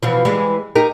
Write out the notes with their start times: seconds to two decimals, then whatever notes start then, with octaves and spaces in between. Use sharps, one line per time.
0.03 B2 E3 F3
0.25 E3 G3 G#3
0.76 D#4 G4 A#4